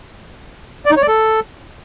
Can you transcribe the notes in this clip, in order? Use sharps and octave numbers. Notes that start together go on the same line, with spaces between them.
D5
D#4
C#5
D5
A4